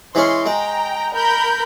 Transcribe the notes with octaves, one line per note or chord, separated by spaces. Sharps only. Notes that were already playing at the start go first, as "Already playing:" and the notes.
E3 G#3 C#4 C6
G#3 G5 A#5
A#4 B5 G6